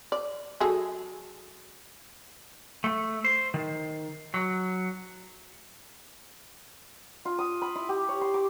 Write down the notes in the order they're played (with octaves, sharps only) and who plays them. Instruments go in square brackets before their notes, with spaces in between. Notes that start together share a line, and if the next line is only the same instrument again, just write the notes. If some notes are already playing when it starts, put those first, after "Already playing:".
[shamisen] D5
F#3 G#4 A4
[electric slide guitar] A3
C5
D#3
F#3
[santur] F4
D#6
B5
E4
G4
C#5
C6
D6